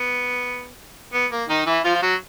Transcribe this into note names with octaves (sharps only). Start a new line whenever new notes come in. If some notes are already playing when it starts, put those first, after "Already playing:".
Already playing: B3
B3
A#3
D#3 D#4
E3 E4
F3 F4
F4
F#3 F#4